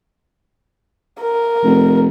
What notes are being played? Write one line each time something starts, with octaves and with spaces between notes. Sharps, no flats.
A#4
F1